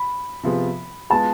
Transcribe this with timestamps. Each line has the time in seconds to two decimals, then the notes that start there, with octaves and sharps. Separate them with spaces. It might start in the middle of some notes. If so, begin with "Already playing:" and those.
Already playing: B5
0.43 C3 F3 B3 F4 G#4
1.10 G#3 B3 F4 A5